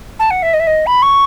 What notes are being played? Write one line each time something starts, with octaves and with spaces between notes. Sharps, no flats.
A5
F#5
E5
D#5
E5
D#5
B5
C#6